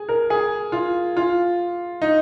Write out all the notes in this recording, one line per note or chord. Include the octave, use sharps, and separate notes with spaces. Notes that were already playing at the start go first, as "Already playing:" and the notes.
Already playing: G#4
A#4
G#4
F4
F4
D#4